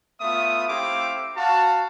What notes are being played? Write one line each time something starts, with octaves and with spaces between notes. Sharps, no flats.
A3 B3 F4 E5 D#6
A3 C4 E4 G4 F5 D6
F#4 F5 A5